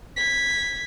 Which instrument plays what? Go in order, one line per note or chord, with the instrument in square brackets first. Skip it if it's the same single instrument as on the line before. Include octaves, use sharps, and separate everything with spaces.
[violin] G#6 B6